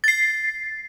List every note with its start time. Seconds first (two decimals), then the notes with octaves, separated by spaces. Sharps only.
0.04 A6 C7